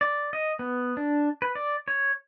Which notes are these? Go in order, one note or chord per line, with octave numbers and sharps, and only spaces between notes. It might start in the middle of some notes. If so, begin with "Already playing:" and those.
D5
D#5
B3
D4
B4
D5
C#5